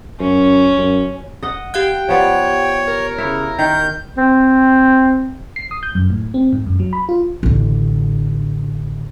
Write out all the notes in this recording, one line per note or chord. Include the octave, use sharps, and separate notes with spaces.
F#2 C#4
F#2
D#5 F#5
G4 F5 G5 F#6
F3 B3 C#5 D5
A#4
C#3 E4 C#5
D#3 G6
C4
C7
D#6
G6
F#2
A2
C4
G#2
F#2
F#3
B5
F4
A1 D3